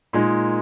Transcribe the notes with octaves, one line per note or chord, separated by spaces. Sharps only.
A#2 G#3 D#4